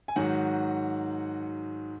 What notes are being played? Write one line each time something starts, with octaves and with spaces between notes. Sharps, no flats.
G#5
G#2 D#3 F#3 F#4 F#5